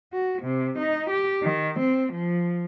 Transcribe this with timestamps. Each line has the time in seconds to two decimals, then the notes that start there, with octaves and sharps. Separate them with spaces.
0.13 F#4
0.43 C3
0.79 D#4
1.10 G4
1.42 D#3
1.80 C4
2.13 F3